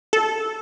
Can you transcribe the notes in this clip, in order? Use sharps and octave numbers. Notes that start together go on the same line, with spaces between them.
A4